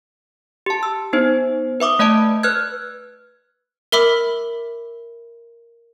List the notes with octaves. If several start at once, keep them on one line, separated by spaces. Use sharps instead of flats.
G4 A5
E6
B3 D#4 C5
B4 E5 D6 D#6
A3 D5 D#5 A5 D7
B4 F6 F#6 G#6
A#4 E5 B5 D6 E6